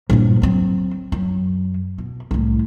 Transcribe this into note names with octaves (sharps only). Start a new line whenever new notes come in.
A#1 G2
F#3 C4
F#2
B2
C2 A2